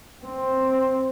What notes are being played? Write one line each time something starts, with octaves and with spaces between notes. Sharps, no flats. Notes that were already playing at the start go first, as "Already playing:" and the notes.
C4